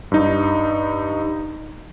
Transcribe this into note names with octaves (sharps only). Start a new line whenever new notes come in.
G2 D#4